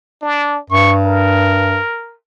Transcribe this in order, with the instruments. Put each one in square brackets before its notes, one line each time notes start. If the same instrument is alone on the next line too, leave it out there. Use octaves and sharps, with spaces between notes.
[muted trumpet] D4
[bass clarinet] G2 [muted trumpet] C#6
[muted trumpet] A#4